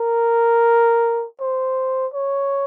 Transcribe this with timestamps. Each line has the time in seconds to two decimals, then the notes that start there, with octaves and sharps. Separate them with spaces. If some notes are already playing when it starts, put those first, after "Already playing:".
Already playing: A#4
1.40 C5
2.14 C#5